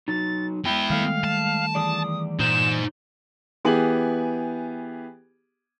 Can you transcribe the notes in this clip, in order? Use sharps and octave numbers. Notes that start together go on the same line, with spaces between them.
F#3 D#4 A6
G#3 B3 E4 G5 G7
D#3 G3 A3 F5
A5
E3 G#4 D5 D#6
A#2 D#4 C5 E7
E3 B3 G4 G#4 G#5 F#7